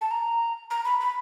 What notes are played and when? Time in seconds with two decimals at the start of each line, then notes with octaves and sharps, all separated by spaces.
0.01 A5
0.11 A#5
0.70 A#5
0.85 B5
1.00 B5